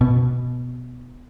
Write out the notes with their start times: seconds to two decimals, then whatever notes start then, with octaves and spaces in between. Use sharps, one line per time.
0.01 B2